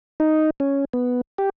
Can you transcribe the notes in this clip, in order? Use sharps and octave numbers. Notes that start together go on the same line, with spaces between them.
D#4
C#4
B3
G4